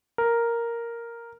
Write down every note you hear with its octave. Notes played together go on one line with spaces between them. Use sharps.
A#4